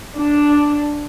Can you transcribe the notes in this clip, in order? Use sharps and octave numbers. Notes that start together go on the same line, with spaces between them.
D4